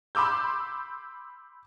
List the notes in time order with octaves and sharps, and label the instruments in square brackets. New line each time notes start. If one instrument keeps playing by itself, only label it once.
[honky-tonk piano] B5 C6 D6 E6 G6